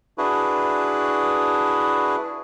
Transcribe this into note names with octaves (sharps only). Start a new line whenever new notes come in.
D4 E4 F#4 G#4 B4